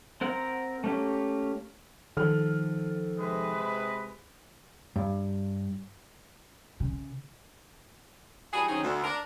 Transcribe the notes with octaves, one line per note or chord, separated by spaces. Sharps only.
C4 A#4 F#5
A3 A#3 C#4 G4
D#3 F3 A4 F6
C3 G#3 B4
G2
C#3
E3 G3 D4 F#4 G#4
D#3 F#3 C4 C#4 D#4 G#4
D2
D4 A#4